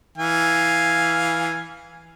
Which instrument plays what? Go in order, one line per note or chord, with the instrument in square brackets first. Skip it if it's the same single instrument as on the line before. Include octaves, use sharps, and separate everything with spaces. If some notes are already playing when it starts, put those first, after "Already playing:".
[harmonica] E3 F5 G#5